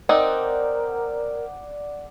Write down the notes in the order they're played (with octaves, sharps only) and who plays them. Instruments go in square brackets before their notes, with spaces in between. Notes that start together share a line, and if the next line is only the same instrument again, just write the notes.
[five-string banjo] C4 D#4 [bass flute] A#4 [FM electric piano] D5 F#5 D6